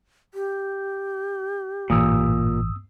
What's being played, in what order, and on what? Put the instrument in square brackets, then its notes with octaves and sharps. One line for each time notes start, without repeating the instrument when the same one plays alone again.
[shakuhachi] G4
[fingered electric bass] A1 E3 [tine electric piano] G2 D#6 E6 [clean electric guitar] A#2